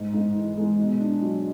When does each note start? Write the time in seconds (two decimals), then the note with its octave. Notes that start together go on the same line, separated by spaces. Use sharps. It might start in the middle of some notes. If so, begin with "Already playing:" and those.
Already playing: G#2
0.14 G#2
0.35 E3
0.57 G#3
0.79 B2
1.00 D4
1.22 F#3